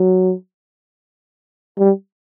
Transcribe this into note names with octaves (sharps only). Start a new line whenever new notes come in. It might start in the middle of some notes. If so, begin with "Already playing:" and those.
Already playing: F#3
G3